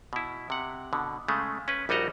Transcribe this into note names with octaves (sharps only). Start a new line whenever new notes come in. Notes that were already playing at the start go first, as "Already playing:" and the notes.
B2 E4
C3 F#5
B2 D3
C#3 G#3 A3
C#4 B4
A#1 G3 D#4 F#4 D#5 A#5